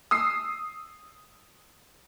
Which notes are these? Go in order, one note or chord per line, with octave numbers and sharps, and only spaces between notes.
D#6 E6 C7